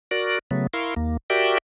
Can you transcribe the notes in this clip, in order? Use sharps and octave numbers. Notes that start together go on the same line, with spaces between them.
F#4 A#4 D5
C#3 F#3 A3 B3
E4 A#4 F5 C6 C#6
D#2 A#3
F#4 G4 A#4 D5 E5 G5